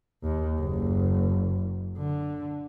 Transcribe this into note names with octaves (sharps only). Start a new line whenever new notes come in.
D#2
F#1
D3